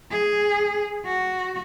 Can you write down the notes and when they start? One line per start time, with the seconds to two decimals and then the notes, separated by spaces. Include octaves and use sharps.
0.11 G#4
1.05 F#4